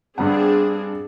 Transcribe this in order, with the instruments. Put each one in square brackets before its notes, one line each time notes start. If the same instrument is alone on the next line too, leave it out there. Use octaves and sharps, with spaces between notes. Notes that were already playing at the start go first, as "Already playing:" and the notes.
[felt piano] G2 B3 F#5 [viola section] C4 D4 G#4